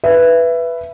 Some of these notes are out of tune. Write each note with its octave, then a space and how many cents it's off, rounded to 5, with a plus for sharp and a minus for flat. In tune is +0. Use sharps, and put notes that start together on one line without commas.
B4 +0 E5 +20